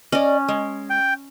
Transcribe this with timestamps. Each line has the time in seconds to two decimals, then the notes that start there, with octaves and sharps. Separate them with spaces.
0.12 C#4 D5 D#5
0.48 G#3
0.90 G5